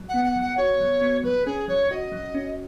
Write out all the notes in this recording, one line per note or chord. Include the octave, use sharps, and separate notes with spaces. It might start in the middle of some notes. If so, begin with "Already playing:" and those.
Already playing: F#3
F#5
B3
F#5
F#3
F#5
F#4 C#5
F#3
B3
F#3 B4
C#4 G#4
F#3 C#5
F#4 D#5
F#3
C#4